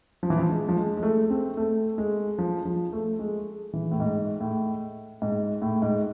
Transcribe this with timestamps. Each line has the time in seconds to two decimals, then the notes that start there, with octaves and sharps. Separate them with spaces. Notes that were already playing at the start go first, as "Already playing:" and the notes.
0.23 F3
0.30 E3
0.37 F3
0.50 G#3
0.68 F3
0.76 G#3
0.97 G#3
1.03 A3
1.30 C4
1.57 A3
1.98 G#3
2.38 F3
2.65 F3
2.93 A3
3.19 G#3
3.73 E3
3.91 A2
4.00 G#2
4.41 A2
5.22 G#2
5.62 A2
5.82 G#2